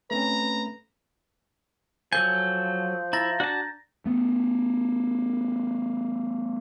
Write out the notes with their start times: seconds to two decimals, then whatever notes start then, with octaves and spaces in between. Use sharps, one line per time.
0.11 A3 C4 C#4 B4 A#5
2.13 F3 F#3 A4 G#5 G6
3.13 E4 A#5 A6 A#6
3.40 D4 F#4 A5
4.05 A3 B3